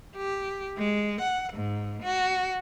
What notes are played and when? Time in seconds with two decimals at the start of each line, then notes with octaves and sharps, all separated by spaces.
0.16 G4
0.78 G#3
1.21 F#5
1.53 G#2
2.03 F#4